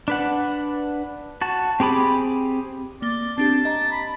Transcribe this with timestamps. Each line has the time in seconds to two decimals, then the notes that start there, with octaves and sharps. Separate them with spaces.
0.08 D4 B4 F#5
1.41 F#4 A5
1.80 C4 G4 G#4 B5 D6
3.02 A#3 D5 G7
3.38 C4 D4 G4 A5
3.65 D#5 A#5
3.91 B5